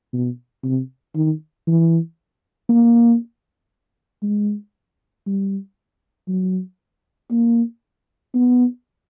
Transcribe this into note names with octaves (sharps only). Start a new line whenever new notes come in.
B2
C3
D#3
E3
A#3
G#3
G3
F#3
A#3
B3